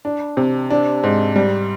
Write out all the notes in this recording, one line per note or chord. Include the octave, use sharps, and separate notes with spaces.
D4
C3
D4
G#2
G3